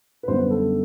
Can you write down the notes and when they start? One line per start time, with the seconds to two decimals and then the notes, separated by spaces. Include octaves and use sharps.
0.23 B4
0.28 F#2 D3 G3 B3 C5
0.39 B4
0.50 A4